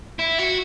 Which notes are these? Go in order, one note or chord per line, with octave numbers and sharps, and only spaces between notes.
E4
F#4